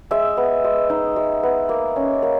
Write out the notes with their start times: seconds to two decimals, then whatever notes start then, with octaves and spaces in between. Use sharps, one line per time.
0.11 G#3 E5
0.37 B3
0.64 G#3
0.90 D#4
1.16 G#3
1.43 B3
1.69 A#3
1.96 C#4
2.22 A#3